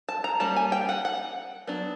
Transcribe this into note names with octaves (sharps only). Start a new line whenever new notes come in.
A5
A#5
G3 A#3 C#4 A5
G#5
G5
F#5
F#5
F#3 B3 D4